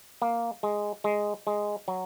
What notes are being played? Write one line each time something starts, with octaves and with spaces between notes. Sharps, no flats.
A#3
G#3
G#3
G#3
F#3